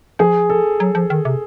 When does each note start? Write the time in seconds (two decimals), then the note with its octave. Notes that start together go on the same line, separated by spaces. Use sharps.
0.19 F3 G#4
0.50 A4
0.80 F#3
0.95 F3
1.10 D#3
1.25 C3